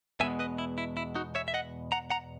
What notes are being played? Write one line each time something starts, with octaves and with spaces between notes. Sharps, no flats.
E2 B2 G#3 B3 E5 G#5
B4 D#5
E4
E4
E4
D#4 F#4
C#5 E5
E5
D#5 F#5
F#5 A#5
F#5 A#5